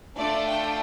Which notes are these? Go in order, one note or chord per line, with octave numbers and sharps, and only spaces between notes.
A3 D4 F4 A4 D5
G5